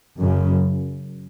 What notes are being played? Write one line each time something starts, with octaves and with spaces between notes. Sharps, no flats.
F#2 C#3